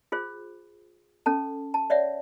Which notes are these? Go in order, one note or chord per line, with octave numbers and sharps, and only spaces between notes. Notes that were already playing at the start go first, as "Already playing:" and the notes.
F4 G#4 C5
C#4 A4 A5
A5
C#5 D5 E5 F#5